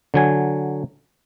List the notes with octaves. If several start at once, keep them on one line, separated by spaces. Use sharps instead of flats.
D3 F#3 G#5